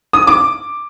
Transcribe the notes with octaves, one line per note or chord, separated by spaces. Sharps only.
D#6
D6